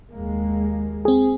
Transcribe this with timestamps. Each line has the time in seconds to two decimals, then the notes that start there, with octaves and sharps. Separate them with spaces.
0.11 D#2 G#3 A#3
1.05 C4 G#4